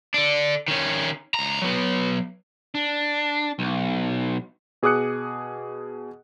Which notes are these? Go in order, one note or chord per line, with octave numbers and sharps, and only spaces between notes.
D3 D4
D#3 C#4
C#2 A#5
F#3 B3
D4
B1
B2 G#4 D6 D#6 F#6 C#7